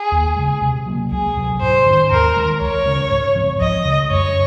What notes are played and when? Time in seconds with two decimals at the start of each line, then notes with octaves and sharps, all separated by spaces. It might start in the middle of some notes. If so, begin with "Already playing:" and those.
Already playing: G#4
0.12 D#2
0.36 C#3 G#3
0.62 C3
0.86 F#3 A#3
1.11 C#2 G#4
1.37 C3 F#3
1.61 G#2 C5
1.86 D#3 G#3 C#4
2.11 D#2 A#4
2.36 D#3 G#3
2.61 C#2 C#5
2.86 C#3 G#3 C#4
3.10 G#2
3.36 F3 C4
3.60 C#2 D#5
3.85 C#3 G#3
4.11 F#2 C#5